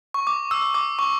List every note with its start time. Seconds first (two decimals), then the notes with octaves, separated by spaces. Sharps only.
0.14 C#6
0.27 D6
0.51 E6
0.74 D6
0.99 C#6